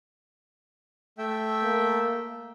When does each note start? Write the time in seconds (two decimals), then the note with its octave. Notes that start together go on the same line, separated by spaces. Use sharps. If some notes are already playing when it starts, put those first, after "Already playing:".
1.18 A3 E5 G5
1.63 A#3